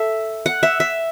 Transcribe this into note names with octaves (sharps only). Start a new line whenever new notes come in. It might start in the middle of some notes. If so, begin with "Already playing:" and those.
Already playing: A4 E5
F#5
E5
E5